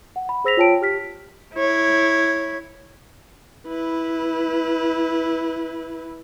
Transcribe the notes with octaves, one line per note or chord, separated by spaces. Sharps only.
F#5
B5
G#4 C5 E6 A#6 B6 F7
F4 C#5 G5 A5 D7
G4 F6 B6
E4 C#5
E4 B4